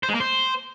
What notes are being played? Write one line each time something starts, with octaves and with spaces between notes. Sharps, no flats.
C5
G#3
A#3
C5